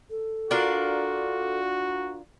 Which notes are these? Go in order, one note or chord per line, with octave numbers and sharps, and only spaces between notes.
A4
D4 F4 F#4 A#4